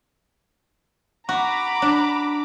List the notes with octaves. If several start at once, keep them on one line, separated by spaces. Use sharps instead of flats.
F#4 A#5 B5 D6
D4